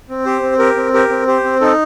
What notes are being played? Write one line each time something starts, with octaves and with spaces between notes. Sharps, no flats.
C4
G4 C5
C4
G4 A#4
C4
G4 A#4
C4
G4 C5
C4
D#4 A4